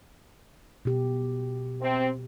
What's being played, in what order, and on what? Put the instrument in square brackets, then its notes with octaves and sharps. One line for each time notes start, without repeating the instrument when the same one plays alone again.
[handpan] B2 G4
[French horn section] C3 C4